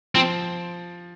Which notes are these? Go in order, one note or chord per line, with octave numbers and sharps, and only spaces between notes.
F3 C4